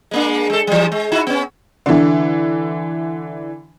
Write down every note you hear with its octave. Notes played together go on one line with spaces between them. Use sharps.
G#3 A#3 D4
G#3 A4
E3 G3
G#3
D#4 E4 F#4
B3 C#4
D3 E3